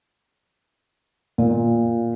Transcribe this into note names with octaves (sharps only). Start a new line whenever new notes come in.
A#2